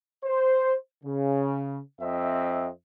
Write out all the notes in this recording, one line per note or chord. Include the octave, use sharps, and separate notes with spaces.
C5
C#3
F2 C4 D#5 E5